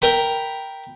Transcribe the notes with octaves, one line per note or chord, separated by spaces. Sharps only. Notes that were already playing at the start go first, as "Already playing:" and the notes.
A#4 G5 B5